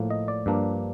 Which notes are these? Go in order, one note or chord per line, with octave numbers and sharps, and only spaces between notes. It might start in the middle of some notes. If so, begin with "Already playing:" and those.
Already playing: A2 F3 A#3
D#5
D5
G2 F3 A#3 D4